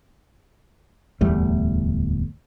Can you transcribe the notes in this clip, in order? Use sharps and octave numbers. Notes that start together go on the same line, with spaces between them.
D1 E2 G3 A3